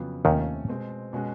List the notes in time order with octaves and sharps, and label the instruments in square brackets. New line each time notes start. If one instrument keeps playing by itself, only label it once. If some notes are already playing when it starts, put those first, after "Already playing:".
Already playing: [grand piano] F2 C#3 F#3 B3
[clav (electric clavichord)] D#2 D#3 [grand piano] C3 F3 A3 C#4
[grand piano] B2 G#3 C4
B2 G#3 C#4 F#4